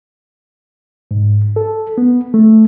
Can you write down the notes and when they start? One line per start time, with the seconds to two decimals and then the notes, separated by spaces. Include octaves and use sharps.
1.11 G#2
1.56 A4
1.98 B3
2.34 A3